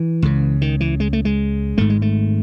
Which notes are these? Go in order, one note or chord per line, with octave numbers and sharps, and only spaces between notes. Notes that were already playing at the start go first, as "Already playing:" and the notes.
Already playing: E3
C#2 C#3
D#3
E3
G#3
A3
G#3
G#1 G#2 A3
G#3
A3